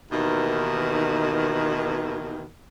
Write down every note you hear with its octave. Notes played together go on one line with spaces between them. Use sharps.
D#2 B2 D#3 E3